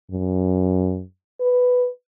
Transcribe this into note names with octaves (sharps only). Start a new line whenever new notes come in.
F#2
B4